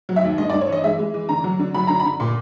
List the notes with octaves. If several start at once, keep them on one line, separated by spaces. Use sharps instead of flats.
F#3
E5
D#2
G2 D#5
D5
G2
C#5
E3 D#5
G#3 E5
G#3
E3
D3 A#5
F#3
D3
F#3 B5
D3 A#5
B5
D3
A#2 C6